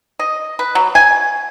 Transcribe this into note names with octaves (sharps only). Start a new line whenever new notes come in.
D#5
B4
F#3
G#5